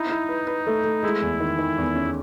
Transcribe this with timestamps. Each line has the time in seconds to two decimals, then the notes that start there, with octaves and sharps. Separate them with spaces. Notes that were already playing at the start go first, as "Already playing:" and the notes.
Already playing: D#4 E4
0.11 E4
0.29 B4
0.47 B4
0.67 A3
0.84 A3
1.03 G#3 E4
1.22 E2
1.40 D#3
1.59 D#3
1.78 E2
1.95 C#4